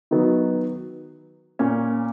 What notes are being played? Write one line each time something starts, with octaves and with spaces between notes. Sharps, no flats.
D#3 F#3 B3 D#4
A#2 A#3 C#4